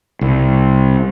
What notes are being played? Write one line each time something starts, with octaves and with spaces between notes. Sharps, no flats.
C2